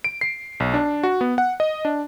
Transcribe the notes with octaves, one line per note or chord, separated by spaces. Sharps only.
D7
C7
B1
D4
F#4
B3
F#5
D#5
D4